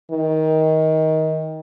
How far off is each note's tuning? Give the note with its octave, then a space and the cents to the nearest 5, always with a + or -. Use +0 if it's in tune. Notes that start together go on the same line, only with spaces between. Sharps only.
D#3 +20